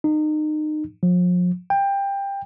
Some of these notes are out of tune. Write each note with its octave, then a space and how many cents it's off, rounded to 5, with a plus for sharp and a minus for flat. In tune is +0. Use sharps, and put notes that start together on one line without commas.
D#4 -30
F3 +40
G5 +20